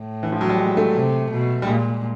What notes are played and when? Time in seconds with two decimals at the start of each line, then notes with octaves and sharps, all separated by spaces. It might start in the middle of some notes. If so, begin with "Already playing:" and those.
Already playing: A2
0.23 E3
0.32 F3
0.41 F#3
0.49 G3
0.58 G#3
0.77 A3
0.94 C3
1.30 B2
1.62 G3
1.66 A#2 G#3